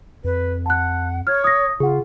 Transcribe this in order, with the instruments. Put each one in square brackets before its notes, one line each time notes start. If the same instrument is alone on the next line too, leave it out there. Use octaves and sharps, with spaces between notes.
[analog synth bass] F2 [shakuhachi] B4
[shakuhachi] F#5 [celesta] A5 F#6
[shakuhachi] C#5 [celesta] F6 G#6
[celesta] D#6 A#6
[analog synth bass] C#3 [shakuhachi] F4 [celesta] G#4 F#5